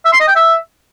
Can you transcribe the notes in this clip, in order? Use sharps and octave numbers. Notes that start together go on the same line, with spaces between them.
E5
C6
D#5
G5
E5